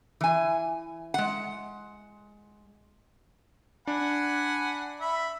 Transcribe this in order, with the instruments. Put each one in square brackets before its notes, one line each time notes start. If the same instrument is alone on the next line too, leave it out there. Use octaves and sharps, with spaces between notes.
[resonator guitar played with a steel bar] E3 G#5
G#3 F#5
[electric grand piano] D4 [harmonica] F#5 G#5 B5
[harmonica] E5 B5